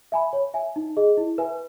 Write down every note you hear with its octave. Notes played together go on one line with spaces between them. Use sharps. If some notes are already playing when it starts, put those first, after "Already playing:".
E5 G#5 B5
C#5
E5 G#5
D#4
G#4 D#5
E4
B4 E5 G#5